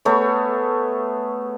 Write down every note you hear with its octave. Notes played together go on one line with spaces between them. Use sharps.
A3 B3 G#4 C#5